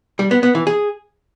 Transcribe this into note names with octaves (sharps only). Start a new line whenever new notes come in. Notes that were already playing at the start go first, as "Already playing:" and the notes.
G3
B3
B3
E3
G#4